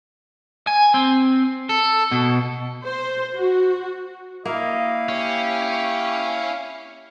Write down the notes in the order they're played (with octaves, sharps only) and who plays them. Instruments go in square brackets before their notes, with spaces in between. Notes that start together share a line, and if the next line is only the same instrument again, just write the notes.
[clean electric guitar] G#5
C4
A4
B2
[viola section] C5
F#4
[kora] A#3 [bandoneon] E4 F5 [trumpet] D#5
[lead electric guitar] C#4 [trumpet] G4